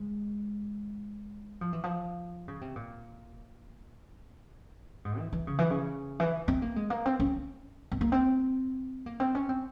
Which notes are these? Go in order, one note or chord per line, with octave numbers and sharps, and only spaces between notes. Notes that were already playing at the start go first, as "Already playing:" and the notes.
Already playing: G#3
F3
E3
F3
C#3
C3
A#2
G#2
E3
E3
C#3
E3
C#3
E3
C4
A#3
G#3
A#3
C4
C#4
C4
A#3
C4
A#3
C4
C#4
C4